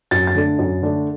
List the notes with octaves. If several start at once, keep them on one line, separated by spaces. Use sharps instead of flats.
F#2 A6
A6
D3 A3 D4
F#2
D3 A3 D4